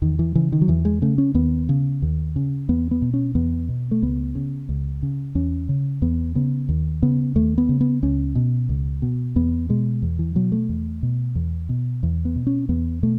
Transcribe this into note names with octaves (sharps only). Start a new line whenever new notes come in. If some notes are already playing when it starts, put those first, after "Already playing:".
E2 D#3
E3
C#3 E3
D#3
F#3
E2 E3
G#3
C#3 A3
C#4
D#2 B3
C#3
D#2
C#3
E2 B3
B3
B2
C#4
E2 B3
B2
A3
C#2 B3
C#3
C#2
C#3
E2 C#4
C#3
E2 B3
C#3 B3
D#2
C#3 B3
D#2 A3
B3
C#3
B3
C#2 C#4
B2
C#2
B2
E2 B3
B2 G#3
E2
E3
B2 F#3
A3
E2
B2
E2
B2
E2
B3
B2
C#4
E2 B3
B2 A3